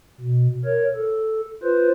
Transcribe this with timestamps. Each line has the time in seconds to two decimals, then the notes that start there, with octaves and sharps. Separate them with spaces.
0.20 B2
0.65 A#4 C#5
0.95 A4
1.63 F4 B4 C5